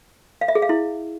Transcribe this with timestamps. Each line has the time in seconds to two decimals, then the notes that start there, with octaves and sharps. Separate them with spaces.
0.41 F5
0.48 E5
0.55 G#4
0.62 F5
0.69 E4